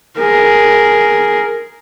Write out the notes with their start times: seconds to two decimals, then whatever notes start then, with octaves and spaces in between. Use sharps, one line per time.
0.18 G#4 A#4